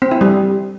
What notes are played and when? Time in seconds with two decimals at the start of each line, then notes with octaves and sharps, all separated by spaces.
0.02 C4
0.11 E4
0.21 G3